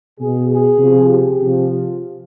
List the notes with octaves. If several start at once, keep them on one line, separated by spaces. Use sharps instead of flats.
B2 G#4
G#4
C3 F3
G4
C3 F3
F4